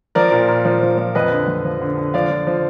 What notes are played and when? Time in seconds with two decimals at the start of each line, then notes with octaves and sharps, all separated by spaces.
0.15 F3 A#4 D5
0.32 A#2
0.48 A#2
0.65 F3
0.82 F3
0.98 F3
1.15 F2 B4 D#5
1.31 D3
1.48 F2
1.65 F3
1.81 D3
1.98 D3
2.14 F3 D5 F5
2.30 F3
2.47 F3